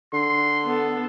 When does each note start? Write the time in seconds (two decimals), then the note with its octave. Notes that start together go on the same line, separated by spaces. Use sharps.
0.13 D3 C6
0.65 B3 A4